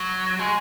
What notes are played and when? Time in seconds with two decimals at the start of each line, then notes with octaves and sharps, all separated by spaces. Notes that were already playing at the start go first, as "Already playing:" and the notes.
Already playing: F#3
0.39 G#3